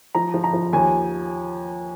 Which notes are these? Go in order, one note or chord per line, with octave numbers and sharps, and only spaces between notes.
F3 A#5
F3
A#5
F3
D#2 G#5